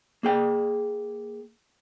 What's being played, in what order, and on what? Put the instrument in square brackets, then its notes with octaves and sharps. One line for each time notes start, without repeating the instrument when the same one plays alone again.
[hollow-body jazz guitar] A#3 G#4 G5